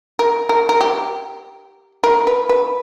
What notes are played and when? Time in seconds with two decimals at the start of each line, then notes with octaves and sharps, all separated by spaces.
0.19 A#4
0.49 A#4
0.69 A#4
0.81 G4
2.04 A#4
2.27 B4
2.49 B4